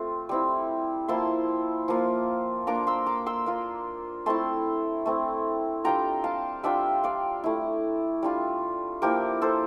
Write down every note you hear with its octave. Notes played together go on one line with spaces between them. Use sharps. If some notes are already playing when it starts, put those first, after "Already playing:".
Already playing: A3 C4 F4
G3 C4 E4
F3 A#3 E4 A5 C6
F3 A#3 F4
A#3 D4 F4 A#5 D6
C6 E6
A#5 D6
C6 E6
A#3 F4
A3 C4 E4 A5 C6
A3 C4 E4
G3 D4 F4 G5 A#5
F5 A5
G3 D4 F4 E5 G5
D5 F5
A3 E4
G3 D4 F4
F3 A#3 E4 G4 A#4
A4 C5